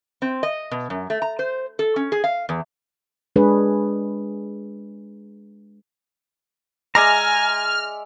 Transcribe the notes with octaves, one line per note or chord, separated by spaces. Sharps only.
C4
D#5
B2
F#2
A3
A#5
C5
A4
C#4
G#4
F5
E2
G#3 D4 G#4 B4 C#5
G#3 D5 E5 G#5 A#5 F6